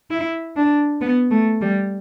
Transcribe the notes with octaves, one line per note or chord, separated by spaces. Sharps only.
E4
D4
B3
A3
G3